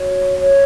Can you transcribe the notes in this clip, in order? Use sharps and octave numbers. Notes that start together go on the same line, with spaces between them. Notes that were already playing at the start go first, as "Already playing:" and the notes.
Already playing: F#4 C#5
C#5